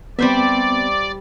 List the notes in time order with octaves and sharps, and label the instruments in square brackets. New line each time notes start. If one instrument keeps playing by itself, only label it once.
[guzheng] G3 C5 E5 [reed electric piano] B3 C4 [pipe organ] D5